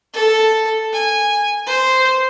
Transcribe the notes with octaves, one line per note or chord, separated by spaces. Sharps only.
A4
G#5
C5